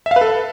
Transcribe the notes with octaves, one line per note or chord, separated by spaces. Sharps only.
E5
F5
B4
A4